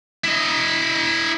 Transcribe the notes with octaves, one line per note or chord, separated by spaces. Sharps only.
E4 D#5